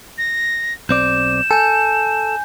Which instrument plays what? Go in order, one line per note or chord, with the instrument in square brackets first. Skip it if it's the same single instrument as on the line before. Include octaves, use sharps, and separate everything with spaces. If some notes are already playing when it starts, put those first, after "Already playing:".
[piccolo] A#6
[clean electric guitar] B1 C4 D5 [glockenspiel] G6 [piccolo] E7
[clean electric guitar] A4 [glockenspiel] G#5 G6